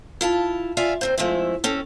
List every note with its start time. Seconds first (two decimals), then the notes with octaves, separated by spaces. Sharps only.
0.21 E4 F4 A5
0.77 F4 D5 E5 G#5
1.01 D#2 C4 C5
1.18 F3 G#3 A3 C4 E4
1.64 C4 C#4 A4